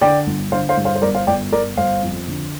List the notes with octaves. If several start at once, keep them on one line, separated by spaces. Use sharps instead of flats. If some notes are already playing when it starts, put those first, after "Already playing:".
D3 D5 G5
G1
D3 C5 F5
C5 F5
G2
C5 F5
C5
G1 A#4 D5
C5 F5
G1 D5 G5
G1 A#4 D5
G1 C5 F5
F2
D3